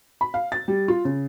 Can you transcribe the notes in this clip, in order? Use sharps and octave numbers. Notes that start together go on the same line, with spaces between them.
B5
F5
A6
G3
F4
C#3